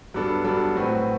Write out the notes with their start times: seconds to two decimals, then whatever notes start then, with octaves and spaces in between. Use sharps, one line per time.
0.14 G2 F#3 B3 D4 A4
0.44 G2 F#3 B3 D4 A4
0.76 A2 F#3 C4 F#4 B4